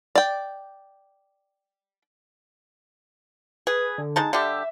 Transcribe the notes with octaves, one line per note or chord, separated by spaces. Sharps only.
D5 G5
G#4 B4
D3
G#3 D#4 A5
D3 G3 G4 E5